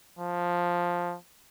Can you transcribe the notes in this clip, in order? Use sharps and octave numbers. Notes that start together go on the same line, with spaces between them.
F3